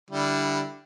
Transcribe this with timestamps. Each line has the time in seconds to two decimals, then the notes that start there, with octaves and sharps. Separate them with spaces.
0.11 D3 G3 E4